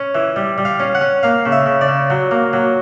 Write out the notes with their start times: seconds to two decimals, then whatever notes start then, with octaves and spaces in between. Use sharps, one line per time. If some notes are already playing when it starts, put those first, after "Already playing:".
Already playing: C#4
0.15 E3
0.36 G3
0.58 G3
0.65 F5
0.80 C#4
0.95 F#5
1.01 C#4
1.23 A#3 F5
1.46 C#3
1.52 E5
1.66 C#3
1.81 D5
1.88 C#3
2.10 F#3
2.31 A#3
2.53 F#3